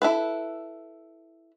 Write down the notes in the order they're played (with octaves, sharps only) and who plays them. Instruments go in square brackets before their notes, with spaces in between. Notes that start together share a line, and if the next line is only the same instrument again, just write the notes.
[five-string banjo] E4 A4 B4